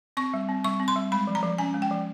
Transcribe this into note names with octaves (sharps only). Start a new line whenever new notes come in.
C4 C#6
G3
C4
G3 C#6
C4
C6
G3
G#3 B5
F3
A#5
F3
C#4 G#5
G#3
G5
F3